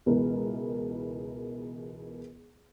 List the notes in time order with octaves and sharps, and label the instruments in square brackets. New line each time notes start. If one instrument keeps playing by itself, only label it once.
[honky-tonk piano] C#2 B2 E3 B3 A#4